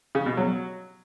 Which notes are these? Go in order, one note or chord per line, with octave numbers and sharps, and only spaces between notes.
C#3
B2
F#3